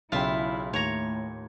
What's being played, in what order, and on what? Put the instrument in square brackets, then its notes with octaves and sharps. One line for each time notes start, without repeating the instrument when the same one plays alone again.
[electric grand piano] B1 C#3 G5 [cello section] E4 [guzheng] F4 E5
[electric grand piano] D#2 [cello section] A2 [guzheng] C#5 A#5